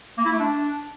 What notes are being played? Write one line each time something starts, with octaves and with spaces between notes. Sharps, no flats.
A#3
E4
A3
D4